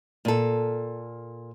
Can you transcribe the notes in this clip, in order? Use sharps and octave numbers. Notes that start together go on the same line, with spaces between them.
A#2 A4